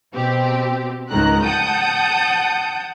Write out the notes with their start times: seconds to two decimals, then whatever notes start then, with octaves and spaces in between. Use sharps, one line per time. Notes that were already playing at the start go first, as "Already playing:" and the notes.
0.14 B2 C4 G4
1.10 C#2 G#2 D#3 A#5 F#6
1.43 F#5 G5 A5 D#6 G6